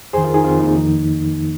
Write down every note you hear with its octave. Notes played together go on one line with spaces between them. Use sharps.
F2 D#3 G#4 C5
F4 A#4
D#4 G#4
F2 D#3 C4 F4
A#3 D#4
F2 D#3